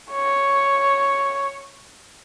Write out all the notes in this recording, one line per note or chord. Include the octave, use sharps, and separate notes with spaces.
C#5